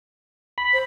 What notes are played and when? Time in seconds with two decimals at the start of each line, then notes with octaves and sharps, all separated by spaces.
0.58 B5
0.73 C5